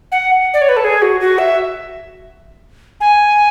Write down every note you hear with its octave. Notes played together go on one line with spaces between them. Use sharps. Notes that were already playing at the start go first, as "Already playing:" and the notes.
F#5
D5
C#5
B4
A4
G#4
F#4
F#4
E5
G#5